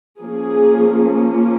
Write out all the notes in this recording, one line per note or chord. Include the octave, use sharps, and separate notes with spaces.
F3 A#3 C#4 G#4